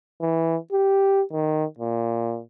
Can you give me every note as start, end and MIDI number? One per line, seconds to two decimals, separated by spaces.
0.21 0.57 52
0.72 1.23 67
1.33 1.64 51
1.79 2.40 46